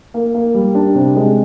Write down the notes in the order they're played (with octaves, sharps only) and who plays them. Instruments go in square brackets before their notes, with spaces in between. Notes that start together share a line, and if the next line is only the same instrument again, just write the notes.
[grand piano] A#3
A#3
G3
D4
C3
G#3